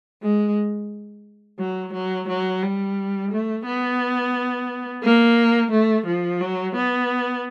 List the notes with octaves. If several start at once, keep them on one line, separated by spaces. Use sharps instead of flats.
G#3
F#3
F#3
F#3
G3
A3
B3
A#3
A3
F3
F#3
B3